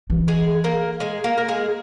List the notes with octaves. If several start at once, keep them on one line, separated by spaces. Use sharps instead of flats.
E3
G#3 G#4
A#3 A#4
G#3 G#4
A#3 A#4
A#4
G#3 G#4